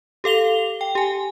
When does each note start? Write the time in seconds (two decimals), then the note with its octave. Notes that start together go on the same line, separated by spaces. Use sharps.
0.24 G4 A4 F5 F7 G7
0.81 G5
0.95 G4 G#5